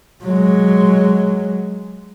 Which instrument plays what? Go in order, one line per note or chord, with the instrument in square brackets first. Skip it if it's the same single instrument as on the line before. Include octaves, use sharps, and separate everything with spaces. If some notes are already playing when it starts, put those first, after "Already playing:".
[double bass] F#3 G#3